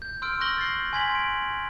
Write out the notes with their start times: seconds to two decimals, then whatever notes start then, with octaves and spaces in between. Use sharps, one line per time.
0.02 G6
0.22 C6 E6 F6 G6 D7
0.40 C#6 E6 F#6 A#6 F#7 G7
0.57 G6 A6 A#6 C7
0.93 G#5 C6 G#6 B6 F#7
1.15 D7